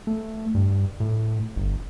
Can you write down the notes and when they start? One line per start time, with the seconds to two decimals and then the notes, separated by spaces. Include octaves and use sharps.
0.07 A3
0.55 G2
1.00 A2
1.56 G1